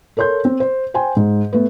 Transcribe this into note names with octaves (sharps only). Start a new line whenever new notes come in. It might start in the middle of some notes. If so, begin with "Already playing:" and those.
A4 A#4 C#5 C6 G6
C4
C5
C5 G5 G#5 C6
G#2
A3 B3